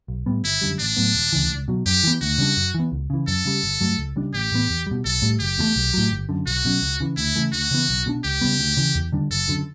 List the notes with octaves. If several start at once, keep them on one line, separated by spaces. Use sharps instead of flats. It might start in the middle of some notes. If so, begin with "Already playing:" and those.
B1
A2 G3 B3
G1 E4
F#2 D3 G3
A1 D4
A2 F#3 B3
E1
D2 C#3 E3
C#2
B2 F#3
F#2 G4
E3 B3
D2 F#4
C#3 G3 D4
F#2
E3 B3
C#2
C#3 E3
F#2 A4
C#3 G3
G1
G2 F#3 A3
C#2
C#3 G3 D4
A1 G4
A2 E3 B3
E2
B2 G3
B1 A4
A2 G3
F#1 G4
E2 B2 A3
B1
A2 F#3
G1
F#2 D3
B1 F#4
B2 F#3 C#4
C#2
C#3 E3
D2 E4
C#3 E3 A3
D2 F#4
C#3 E3 B3
B1
B2 G3 D4
C#2 G4
C#3 G3 B3
D2
C#3 E3
E2
D3 G3 D4
F#1 A4
F#2 D3